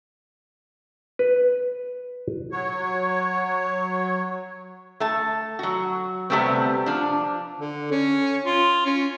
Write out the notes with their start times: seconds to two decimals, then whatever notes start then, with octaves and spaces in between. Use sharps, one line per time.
1.19 B4
2.52 F#3 C#5
5.00 A3 A5
5.59 F#3 F#4
6.30 C3 G3 A3 B3 C4
6.86 F3 D4
7.60 D3
7.91 C#4
8.45 F4
8.86 C#4